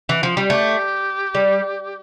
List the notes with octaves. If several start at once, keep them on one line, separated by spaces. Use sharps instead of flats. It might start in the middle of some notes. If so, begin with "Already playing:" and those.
E3
F3
G3
A3 G4
G3